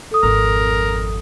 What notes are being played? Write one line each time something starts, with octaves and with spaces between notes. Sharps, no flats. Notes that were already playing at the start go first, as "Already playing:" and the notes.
A4 D#6
G#1 F2 A#4